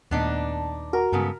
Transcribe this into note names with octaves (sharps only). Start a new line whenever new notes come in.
D#2 A#2 A3 B3 D4 D#4
F#4 A#4
G2 C#3 G#3 B3 A4